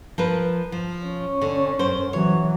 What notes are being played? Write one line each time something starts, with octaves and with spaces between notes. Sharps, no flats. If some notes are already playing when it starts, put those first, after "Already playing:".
F3 A#4 B4
F3
C#4
D3
F#2 C5
E3 F#3 C#5